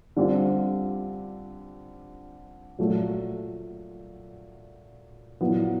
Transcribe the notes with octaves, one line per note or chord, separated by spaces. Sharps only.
D3 G3 C4 F4
A#2 F#3 A3
A#2 F#3 B3 E4